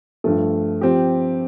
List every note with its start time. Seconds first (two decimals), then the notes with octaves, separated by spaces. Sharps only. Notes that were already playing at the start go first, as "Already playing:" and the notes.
0.24 G2 F3 A3
0.81 F3 C4 G4